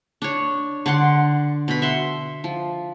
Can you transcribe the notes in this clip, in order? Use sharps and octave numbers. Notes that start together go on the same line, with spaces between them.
D4 C#5
D3 D5 F#5 C6
B2 B5
E5 F#5 C6
F3